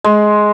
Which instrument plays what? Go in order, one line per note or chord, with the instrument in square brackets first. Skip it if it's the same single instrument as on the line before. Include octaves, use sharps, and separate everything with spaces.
[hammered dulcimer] G#3